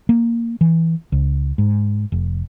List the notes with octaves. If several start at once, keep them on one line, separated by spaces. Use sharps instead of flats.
A#3
E3
C#2
G#2
F1